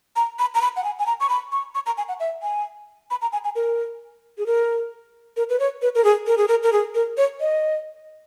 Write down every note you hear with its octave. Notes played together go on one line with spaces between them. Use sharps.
A#5
B5
A#5
B5
F#5
G#5
G#5
A#5
C#6
B5
C#6
C#6
A#5
G#5
F#5
E5
G#5
B5
A#5
G#5
G#5
A#4
G#4
A#4
A#4
B4
C#5
B4
A#4
G#4
A#4
G#4
A#4
A#4
G#4
A#4
C#5
D#5